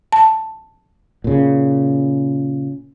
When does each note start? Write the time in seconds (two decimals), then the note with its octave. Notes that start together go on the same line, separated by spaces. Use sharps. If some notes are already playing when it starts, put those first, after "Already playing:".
0.13 A5
1.24 A#2 C#3